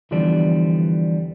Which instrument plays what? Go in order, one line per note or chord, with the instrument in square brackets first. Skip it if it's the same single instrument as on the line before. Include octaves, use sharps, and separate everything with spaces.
[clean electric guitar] E2 D3 E3 F3 G3 D4